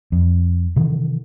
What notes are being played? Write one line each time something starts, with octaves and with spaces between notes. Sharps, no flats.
F2
C3 D#3 E3